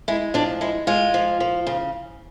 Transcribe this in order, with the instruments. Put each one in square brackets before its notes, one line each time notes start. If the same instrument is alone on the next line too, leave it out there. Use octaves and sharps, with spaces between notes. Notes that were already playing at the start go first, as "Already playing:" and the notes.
[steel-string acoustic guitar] G#3 E4
F3 D4
G#3 E4
G#3 F4
F3
F3
C#3